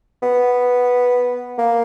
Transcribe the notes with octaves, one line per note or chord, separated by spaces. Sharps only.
B3
A#3